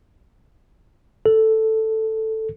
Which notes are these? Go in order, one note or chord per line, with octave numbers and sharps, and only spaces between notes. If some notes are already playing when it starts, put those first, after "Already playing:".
A4